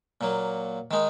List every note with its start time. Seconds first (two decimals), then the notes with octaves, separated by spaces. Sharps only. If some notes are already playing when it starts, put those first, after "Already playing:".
0.21 A#2 F#3 A#3
0.91 D#3 G#3 D#4